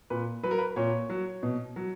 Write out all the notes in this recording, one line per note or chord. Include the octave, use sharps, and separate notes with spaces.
A#2 B4
F#3 B4
A#4
B4
A#2 C#5
F#3
B2
F#3